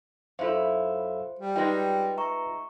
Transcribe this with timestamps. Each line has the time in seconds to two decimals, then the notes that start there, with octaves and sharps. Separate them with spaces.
0.39 F#2 E4 F4 A4 C5 E5 F5
1.39 G3
1.56 G#3 D#4 F4 B4 G5 A#6
2.17 E5 A#5 C#6